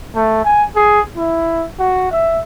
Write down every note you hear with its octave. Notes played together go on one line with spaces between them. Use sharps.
A3
G#5
G#4
E4
F#4
E5